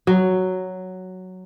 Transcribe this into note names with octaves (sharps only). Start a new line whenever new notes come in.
F#3